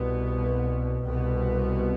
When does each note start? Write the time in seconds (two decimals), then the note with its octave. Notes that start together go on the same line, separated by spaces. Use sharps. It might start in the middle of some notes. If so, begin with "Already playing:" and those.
Already playing: C2 B2 B3
1.03 C2 B2 B3